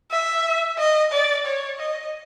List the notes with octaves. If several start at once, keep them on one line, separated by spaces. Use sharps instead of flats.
E5
D#5
D5
C#5
D#5